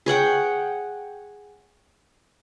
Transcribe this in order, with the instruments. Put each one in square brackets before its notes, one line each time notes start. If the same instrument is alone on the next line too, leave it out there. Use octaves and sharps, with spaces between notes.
[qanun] G#4 C#5 F#5 G5